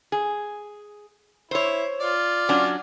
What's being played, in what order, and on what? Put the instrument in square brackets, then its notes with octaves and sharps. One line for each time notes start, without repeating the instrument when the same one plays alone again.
[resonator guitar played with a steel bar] G#4
[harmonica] E4 [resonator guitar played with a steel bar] C5 C#5
[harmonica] F4 D5
[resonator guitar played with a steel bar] F#3 C#4 D4